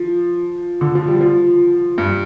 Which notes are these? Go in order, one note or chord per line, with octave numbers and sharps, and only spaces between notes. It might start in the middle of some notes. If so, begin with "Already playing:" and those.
Already playing: F3
D3
F3
G3
F3
G2